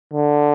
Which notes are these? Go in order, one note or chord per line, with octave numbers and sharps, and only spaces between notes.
D3